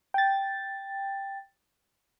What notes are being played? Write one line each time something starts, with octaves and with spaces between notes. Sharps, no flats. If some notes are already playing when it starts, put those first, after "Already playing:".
G5 A6